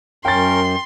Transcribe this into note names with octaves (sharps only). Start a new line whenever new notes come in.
F#2 C#4 A#4 G5 C6 A6